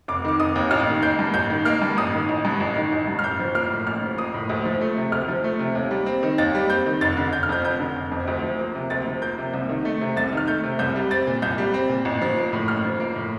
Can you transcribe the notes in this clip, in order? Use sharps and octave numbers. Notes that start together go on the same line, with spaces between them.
F1 D6
D#3 D6
F1 D#6
D#2
A1 F6
D#3
A#3 G6
G2
A1 G6
D#3
A#3 F6
G2
A1 D#6
D#3
A1
G2
A1
D#3
A1
G2
F6
A1 G6
F3
A#3 F6
A2
A1 F6
F3
A#3 D#6
A2
D2
F3
A3
C3
D2 F6
F3
A3
C3
D#2
G3
C4
D#3
D#2 A6
G3
C4 G6
D#3
F1 A6
D3
F1 G6
F6
F2 G6
F1 G6
D3
F1
F2
D2
F3
A#3
C3
D2 A6
F3
A#3 G6
C3
C2
D#3
A3
C3
C2 A6
D#3 F6
A3 G6
C3
C2 G6
G3
C4 A6
A#2
C2 G6
G3
C4
A#2
A1
F3
A#3
A2
A1 F6
F3
A#3
A2